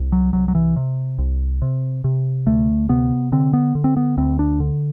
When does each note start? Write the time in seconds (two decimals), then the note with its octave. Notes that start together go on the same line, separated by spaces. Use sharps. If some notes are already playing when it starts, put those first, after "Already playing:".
Already playing: C2
0.12 F#3
0.33 C2 F#3
0.48 F#3
0.55 E3
0.76 C3
1.19 C2
1.62 C3
2.04 C3
2.47 D2 A3
2.89 C3 B3
3.32 D3 C4
3.53 B3
3.75 D3
3.84 C4
3.97 B3
4.18 D2 C4
4.39 D4
4.60 D3